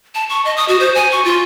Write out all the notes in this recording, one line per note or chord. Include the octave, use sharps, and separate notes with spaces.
A5
C#6
D#5
D#6
F#4
C5
G#5
C#6
F4